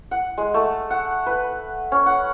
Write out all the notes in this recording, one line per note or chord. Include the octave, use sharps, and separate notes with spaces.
F#5
G#3
A3
F#5
B4
C#4
F#5